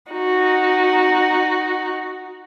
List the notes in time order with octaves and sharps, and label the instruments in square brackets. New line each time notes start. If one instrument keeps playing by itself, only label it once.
[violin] D#4 F#4